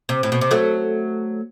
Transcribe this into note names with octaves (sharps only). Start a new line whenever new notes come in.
C3
A2
B2
C3
F#3 A3